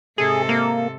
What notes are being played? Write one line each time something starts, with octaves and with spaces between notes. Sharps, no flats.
G#2 C3 G#4 A4
A#3